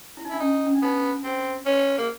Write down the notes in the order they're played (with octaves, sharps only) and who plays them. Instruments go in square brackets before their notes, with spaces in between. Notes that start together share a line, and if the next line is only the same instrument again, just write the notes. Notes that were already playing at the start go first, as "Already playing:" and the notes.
[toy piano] E4
D#4
[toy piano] D4 [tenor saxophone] E4
[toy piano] C#4 [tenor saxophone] D#4
[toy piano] C#4
D4
[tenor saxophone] B3 [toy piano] D#4
[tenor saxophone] C4
C#4
A#3